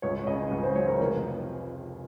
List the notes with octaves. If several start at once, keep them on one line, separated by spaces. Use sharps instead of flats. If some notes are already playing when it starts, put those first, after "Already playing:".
C#2 C#5
C#3 D#5
C#2
C5
F#3 C#5
A#4
F1